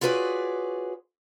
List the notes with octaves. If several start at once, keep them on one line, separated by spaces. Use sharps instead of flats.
F4 F#4 G#4 B4 C#5 D5